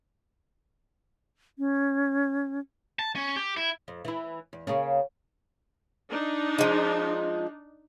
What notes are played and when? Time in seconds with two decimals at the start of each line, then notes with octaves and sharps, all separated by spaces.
1.59 C#4
2.99 A5
3.15 C#4
3.36 G4
3.57 E4
3.88 F2
4.05 E3 E4
4.53 E2
4.67 C#3 A#3 C#4
6.11 D4 D#4
6.58 F3 G#3